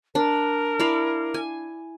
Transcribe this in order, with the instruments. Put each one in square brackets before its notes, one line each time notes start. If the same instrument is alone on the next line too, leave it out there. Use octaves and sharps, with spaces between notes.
[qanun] D4 [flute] A#4
[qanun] E4 D5 F5
G#5